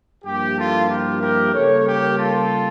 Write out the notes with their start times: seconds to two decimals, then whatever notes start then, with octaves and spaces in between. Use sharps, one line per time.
0.24 G2 F3 A#3 E4 G4
0.57 F4 A4
0.89 G4 A#4
1.21 G4 A#4
1.53 C#3 G3 A#3 A4 C#5
1.85 G4 A#4
2.17 F4 A4